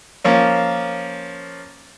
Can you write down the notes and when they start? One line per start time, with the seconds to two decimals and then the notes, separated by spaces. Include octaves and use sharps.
0.25 F3 A#3 C#4